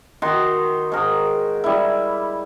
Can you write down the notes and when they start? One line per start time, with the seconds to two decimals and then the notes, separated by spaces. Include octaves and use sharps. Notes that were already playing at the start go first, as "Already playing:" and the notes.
0.22 D#3 F#4 C6
0.92 G#2 A#4
1.64 G3 E4